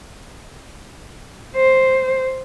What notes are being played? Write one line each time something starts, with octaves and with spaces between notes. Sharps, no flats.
C5